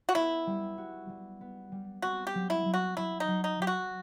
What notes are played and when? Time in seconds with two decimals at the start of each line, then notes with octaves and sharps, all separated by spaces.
0.09 F#4
0.15 B3 E4
0.47 G3
0.78 F#4
1.09 G3
1.41 B3
1.72 G3
2.02 C4 F#4
2.27 G4
2.35 F#3
2.50 E4
2.65 F#3
2.74 F#4
2.97 F#3 E4
3.20 D#4
3.28 F#3
3.44 D#4
3.59 F#3 G4
3.67 F#4